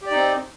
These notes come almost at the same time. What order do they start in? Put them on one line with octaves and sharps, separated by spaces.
G4 D5 D#4 C4